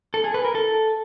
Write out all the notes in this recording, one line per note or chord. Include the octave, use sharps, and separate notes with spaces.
A4
G#4
B4
A#4
A4